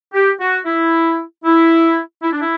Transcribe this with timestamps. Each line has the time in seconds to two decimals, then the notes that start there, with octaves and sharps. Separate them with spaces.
0.13 G4
0.40 F#4
0.66 E4
1.45 E4
2.23 E4
2.33 D4
2.41 E4